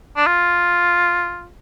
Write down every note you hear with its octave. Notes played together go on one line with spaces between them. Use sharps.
D4
F4